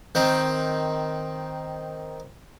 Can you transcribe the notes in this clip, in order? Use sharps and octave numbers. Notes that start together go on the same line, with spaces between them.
D#3 C4